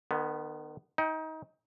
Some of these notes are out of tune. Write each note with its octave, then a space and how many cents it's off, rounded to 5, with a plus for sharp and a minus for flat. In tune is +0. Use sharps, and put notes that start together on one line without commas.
D#3 -40 B3 +0
D#4 +25 G5 -10